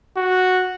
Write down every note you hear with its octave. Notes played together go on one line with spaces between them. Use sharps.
F#4